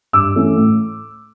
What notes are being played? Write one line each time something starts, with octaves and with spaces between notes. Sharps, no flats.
G2 D6 E6
E3 A3 C#4
A2